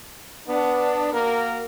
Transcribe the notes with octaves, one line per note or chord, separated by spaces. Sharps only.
B3 D4
A#3 F#4 A#4